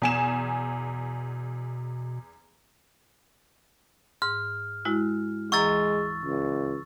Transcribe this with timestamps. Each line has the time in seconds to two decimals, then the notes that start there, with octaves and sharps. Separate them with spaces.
0.02 E2 B2 G#5 E7
4.22 G#2 F6
4.85 G#3 E4 F#4
5.52 D2 E3 G#3 A#5 C#6 E6 A6
6.24 C#2